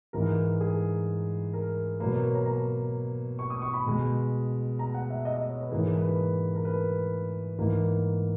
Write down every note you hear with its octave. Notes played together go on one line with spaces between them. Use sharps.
G#2 E3 G#3 A#4
G#4
A#4
B2 F#3 A#3 B4
C#5
C#5
A#5
A#5
C#6
D#6
C#6
B5
B2 G#3
A#5
F#5
E5
D#5
D#5
C#5
B4
G#2 E3 A#3 G#4
B4
B4
A#4
B4
G#2 E3 A#3